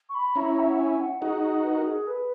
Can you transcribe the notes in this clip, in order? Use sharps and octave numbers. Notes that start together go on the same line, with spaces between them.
C#6
B5
C#4 E4 A#5
E5
F#5
G#5
F#5
D#4 F#4 G#4
B4
A#4
G#4
B4